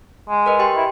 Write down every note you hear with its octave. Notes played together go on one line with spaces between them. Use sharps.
G#3
A#4 B4 D#5
G4 G5 C6
E4